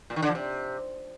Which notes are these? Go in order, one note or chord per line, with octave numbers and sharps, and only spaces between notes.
A#2
D#3
D3
F3
C3